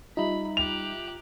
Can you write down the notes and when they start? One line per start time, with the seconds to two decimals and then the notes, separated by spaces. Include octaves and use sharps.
0.17 G3 D#4 F4 E5 A#5 B5
0.57 G4 F#6 F7